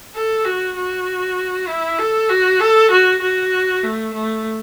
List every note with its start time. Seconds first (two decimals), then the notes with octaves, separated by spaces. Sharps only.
0.15 A4
0.45 F#4
0.76 F#4
1.68 E4
1.99 A4
2.29 F#4
2.60 A4
2.91 F#4
3.21 F#4
3.83 A3
4.14 A3